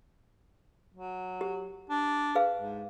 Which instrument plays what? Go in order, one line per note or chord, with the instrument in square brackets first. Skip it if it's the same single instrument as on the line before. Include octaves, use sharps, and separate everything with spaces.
[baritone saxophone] F#3
[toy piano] G4
[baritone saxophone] D4
[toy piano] G#4 B4 F5
[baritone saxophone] G#2